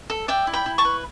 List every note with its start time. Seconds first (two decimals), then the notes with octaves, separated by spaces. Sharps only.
0.10 A4
0.28 D5 E5 G5
0.47 E4
0.53 G5 B5
0.66 E4
0.78 A5 C#6
0.85 B4